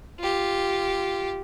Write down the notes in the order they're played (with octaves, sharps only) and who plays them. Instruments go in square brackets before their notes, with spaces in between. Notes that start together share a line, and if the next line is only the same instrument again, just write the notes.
[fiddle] F4 G4